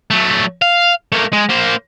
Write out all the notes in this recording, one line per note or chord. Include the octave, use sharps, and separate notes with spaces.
F#3 A3
F5
A3 A#3
G#3
A#3 C5